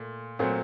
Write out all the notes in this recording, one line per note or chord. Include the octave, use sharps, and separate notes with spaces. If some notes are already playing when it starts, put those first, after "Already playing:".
Already playing: A#2 A3
A#2 F#3 A3 C4